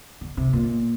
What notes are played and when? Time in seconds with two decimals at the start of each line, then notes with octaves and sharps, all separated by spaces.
0.21 D3
0.37 C3
0.53 A#2